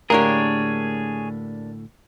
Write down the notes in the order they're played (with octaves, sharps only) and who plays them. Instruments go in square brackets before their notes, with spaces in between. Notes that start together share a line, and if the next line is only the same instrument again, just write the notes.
[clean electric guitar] D2 A2 [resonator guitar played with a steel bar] A#3 D4 G4 [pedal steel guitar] G#4 C#5 [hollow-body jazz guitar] A#4